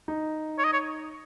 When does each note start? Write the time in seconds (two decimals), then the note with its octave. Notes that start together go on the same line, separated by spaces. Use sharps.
0.08 D#4
0.58 C#5
0.64 D#5
0.73 C#5